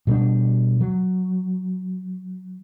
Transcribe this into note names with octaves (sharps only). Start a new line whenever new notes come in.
B2 G3 A#3 D4
F#3